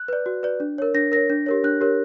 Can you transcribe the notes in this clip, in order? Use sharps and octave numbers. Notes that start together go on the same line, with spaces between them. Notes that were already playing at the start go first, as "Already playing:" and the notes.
Already playing: F#6
B4 D5
F#4
B4 D5
D4
A#4 C#5
D4 A#6
A#4 C#5 A#6
D4
G4 A#4 C#5
D4 F#6
G4 A#4 C#5